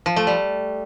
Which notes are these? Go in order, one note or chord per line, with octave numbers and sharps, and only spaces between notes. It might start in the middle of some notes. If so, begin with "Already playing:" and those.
F3
A3
G3